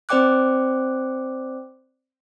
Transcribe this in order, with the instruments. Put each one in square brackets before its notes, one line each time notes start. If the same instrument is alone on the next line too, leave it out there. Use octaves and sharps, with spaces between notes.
[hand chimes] C4 C5 D5 G5 D6 F#6